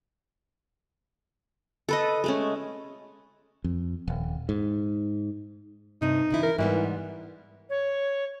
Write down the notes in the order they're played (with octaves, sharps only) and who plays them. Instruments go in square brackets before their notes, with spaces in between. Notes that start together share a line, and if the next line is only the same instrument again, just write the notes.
[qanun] A4 B4 D#5
G#3 A3 C#4
[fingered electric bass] F2
D#1
G#2
[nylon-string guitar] G2 C3 [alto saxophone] D#4
[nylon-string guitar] C#3 E3 E4
[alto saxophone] A#4
[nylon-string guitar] G#2 G3 B3 [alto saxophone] E3
[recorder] C#5